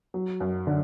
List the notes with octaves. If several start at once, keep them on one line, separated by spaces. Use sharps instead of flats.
F#3
F#2
D3